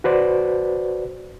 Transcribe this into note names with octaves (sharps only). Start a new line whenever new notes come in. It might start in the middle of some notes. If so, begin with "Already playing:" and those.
F#4 B4 C5 D5